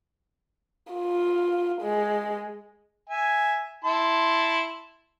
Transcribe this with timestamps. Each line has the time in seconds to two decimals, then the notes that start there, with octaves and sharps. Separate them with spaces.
0.93 F4
1.82 G#3
3.09 E5 G#5
3.84 E4 A5 C6